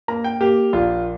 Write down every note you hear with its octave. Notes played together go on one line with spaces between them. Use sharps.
A#3 A#5
G5
A#3 G4
A#1 F4